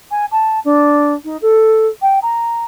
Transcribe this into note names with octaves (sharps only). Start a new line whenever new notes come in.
G#5
A5
D4
D#4
A4
G5
A#5